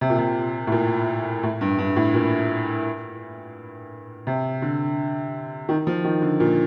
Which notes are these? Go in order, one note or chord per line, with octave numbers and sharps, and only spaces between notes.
C3
A#2
C3
A2
A#2
A2
G2
G2
A2
A#2
C3
D3
D#3
F3
D#3
D3
A#2